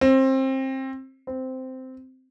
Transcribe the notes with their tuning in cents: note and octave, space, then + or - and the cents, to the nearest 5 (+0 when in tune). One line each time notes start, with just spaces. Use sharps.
C4 +25
C4 -10